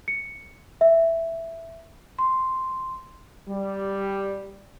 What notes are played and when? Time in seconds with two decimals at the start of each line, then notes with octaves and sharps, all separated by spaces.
0.08 C#7
0.81 E5
2.19 C6
3.48 G3